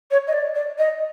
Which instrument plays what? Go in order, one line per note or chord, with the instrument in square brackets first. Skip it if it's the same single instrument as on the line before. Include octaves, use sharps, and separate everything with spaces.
[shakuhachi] C#5
D#5
D5
D5
D#5